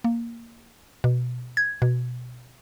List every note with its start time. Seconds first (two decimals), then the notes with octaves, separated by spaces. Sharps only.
0.04 A#3
1.04 B2
1.57 G#6
1.82 B2